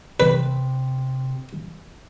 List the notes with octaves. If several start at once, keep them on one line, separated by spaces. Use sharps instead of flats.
C3 B4